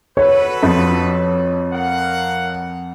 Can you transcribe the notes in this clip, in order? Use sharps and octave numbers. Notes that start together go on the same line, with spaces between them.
F#4 A4 B4 C#5
F2 F3
A#4 F5 F#5